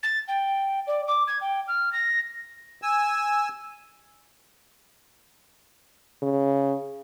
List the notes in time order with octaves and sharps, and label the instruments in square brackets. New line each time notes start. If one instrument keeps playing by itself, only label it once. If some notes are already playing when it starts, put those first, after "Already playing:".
[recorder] A6
G5
D5
D6
G#6
G5
F6
A#6
[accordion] G#5 E6
[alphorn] C#3